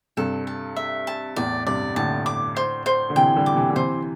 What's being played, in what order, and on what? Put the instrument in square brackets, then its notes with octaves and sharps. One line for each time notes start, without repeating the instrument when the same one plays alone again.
[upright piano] G2 C3 [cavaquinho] A4
[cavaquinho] A4
E5
A5
[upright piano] E2 A2 [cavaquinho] D5
[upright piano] G2 C3 [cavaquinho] D5
[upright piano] A2 D3 [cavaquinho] A5
[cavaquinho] D6
C5
C5
[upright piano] D3
[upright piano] C3 E3 [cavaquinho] G5
[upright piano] D3 G3
[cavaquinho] D6
[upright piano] C3 E3
D3
[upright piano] C3 E3 [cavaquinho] C5